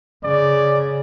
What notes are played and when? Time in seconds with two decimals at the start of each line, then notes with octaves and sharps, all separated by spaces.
0.24 C#3 D5